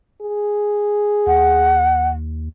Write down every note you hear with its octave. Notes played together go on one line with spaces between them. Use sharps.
G#4
D#2 F#5